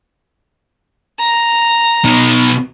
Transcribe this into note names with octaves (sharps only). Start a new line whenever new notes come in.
A#5
B2 D#4